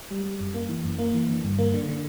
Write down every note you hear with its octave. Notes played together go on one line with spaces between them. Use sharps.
G3
G3
F#2
A#3
E3
F#2
A#3
E3
D3
G2
A#3
D3
D3